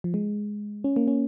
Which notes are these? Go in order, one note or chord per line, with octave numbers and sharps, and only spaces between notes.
F3
G#3
C#4
A#3
C#4